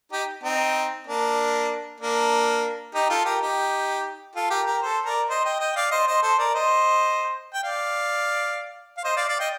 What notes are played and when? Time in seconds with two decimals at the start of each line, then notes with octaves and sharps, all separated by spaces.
0.12 D#4 G4
0.43 C4 D#4
1.07 A#3 D4
2.00 A#3 D4
2.94 D#4 G4
3.10 F4 A4
3.25 G4 A#4
3.41 D#4 G4
4.36 F4 A4
4.50 G4 A#4
4.66 G4 A#4
4.82 A4 C5
5.05 A#4 D5
5.30 C5 D#5
5.45 D#5 G5
5.60 D#5 G5
5.76 D5 F5
5.91 C5 D#5
6.07 C5 D#5
6.23 A4 C5
6.39 A#4 D5
6.54 C5 D#5
7.54 G5
7.63 D5 F5
8.97 F5
9.04 C5 D#5
9.16 D5 F5
9.28 D5 F5
9.40 D#5 G5